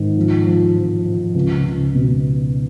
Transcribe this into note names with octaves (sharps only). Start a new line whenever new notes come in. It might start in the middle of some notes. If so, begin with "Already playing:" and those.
Already playing: G#2 D#3
F3
F3
F3
F3
C#2
C#2
B2